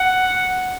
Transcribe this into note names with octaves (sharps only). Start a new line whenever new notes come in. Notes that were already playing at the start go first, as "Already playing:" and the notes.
Already playing: F#5